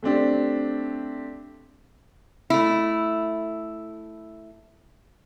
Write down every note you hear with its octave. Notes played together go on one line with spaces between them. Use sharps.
A3 C4 D4 G4
A3 E4